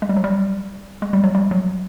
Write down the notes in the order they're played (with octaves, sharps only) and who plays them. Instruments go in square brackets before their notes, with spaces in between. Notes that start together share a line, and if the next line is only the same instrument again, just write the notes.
[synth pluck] G#3
G3
F#3
G3
G#3
G3
F#3
G3
F#3